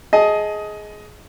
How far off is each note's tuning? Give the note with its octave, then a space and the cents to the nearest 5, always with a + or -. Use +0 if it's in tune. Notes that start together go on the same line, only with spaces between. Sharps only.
G#4 +15 D#5 +15 A5 -5